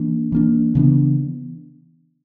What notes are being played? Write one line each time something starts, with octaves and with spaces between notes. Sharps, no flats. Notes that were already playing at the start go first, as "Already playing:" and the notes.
Already playing: E3 A#3 D4
E3 A#3 D4
C#3 E3 B3 D4